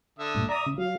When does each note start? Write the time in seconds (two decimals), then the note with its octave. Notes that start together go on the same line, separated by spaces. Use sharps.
0.19 D3 E5 D#6
0.35 G2 A#2
0.49 D5 E5 A#5 D#6
0.66 C#3
0.78 F#3 F5